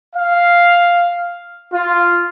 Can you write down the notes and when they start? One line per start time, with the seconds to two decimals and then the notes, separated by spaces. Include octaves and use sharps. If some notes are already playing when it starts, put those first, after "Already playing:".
0.16 F5
1.74 F4